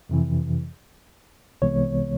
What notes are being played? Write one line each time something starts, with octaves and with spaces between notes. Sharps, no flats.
F2 C3 E3
C2 C3 E3 G#3 B3 C#5